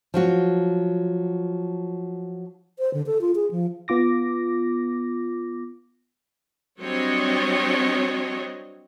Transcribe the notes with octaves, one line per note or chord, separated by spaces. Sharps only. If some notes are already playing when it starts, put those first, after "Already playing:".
F3 F#3 F#4
C5
D3
A4
F4
G#4
F3
B3 F4 D6 A#6
F#3 G3 C4 D4 C#5 D#5